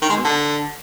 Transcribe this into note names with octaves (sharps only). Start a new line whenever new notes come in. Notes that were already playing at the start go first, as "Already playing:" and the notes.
D#3
G#3
B2
D3